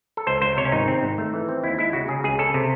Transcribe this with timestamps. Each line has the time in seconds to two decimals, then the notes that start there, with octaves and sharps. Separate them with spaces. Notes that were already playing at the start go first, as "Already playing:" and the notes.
0.17 A4
0.27 C#2 C5
0.42 C#2 C5
0.57 C3 C#5
0.65 C#4
0.72 G#1 D#4
0.88 C4
1.03 G#1
1.18 A3
1.33 E3
1.49 C4
1.64 D#2 E4
1.78 G#3 E4
1.93 C#3 F#4
2.08 C#3 G#4
2.24 C#2 G#4
2.39 C#3 A4
2.54 C3